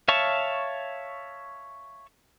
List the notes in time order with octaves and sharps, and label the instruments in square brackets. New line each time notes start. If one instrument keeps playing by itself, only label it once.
[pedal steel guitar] C#5 E5 F5 A5 C#6